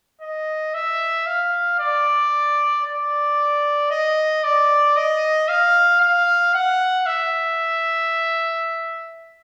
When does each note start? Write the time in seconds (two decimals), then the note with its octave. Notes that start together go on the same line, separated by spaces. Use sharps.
0.21 D#5
0.74 E5
1.26 F5
1.79 D5
2.85 D5
3.91 D#5
4.43 D5
4.96 D#5
5.48 F5
6.00 F5
6.54 F#5
7.06 E5